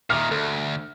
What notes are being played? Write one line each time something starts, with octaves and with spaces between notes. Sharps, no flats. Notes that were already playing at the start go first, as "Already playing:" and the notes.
A#2 D#3 E5 D6 F6
D2 A4